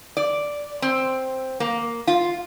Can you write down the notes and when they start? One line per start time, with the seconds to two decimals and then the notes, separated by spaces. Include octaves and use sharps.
0.17 D5
0.82 C4
1.60 A#3
2.07 F4